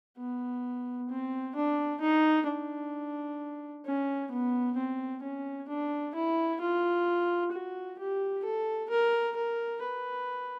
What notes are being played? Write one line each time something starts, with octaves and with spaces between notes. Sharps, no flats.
B3
C4
D4
D#4
D4
C#4
B3
C4
C#4
D4
E4
F4
F#4
G4
A4
A#4
A#4
B4